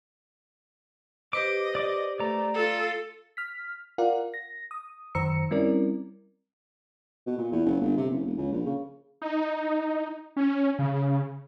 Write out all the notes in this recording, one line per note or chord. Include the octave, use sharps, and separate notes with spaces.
G4 B4 C5 D#5 D6
D5 D6
A3 D5 A#5
F4 A4
F6 B6
F4 A#4 D5 F5 F#5
A#6
D#6
F#2 D#3 C5 A#5 E6 C#7
G3 C4 C#4 E4 A#4 D5
B2
A#2
E2
F#1
G1
C3
F#1
E1
C#2
A#1
C#3
D#4
C#4
C#3